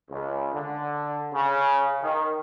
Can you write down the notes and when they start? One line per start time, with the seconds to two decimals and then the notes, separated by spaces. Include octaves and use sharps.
0.10 C#2
0.53 D3
1.32 C#3
2.02 D#3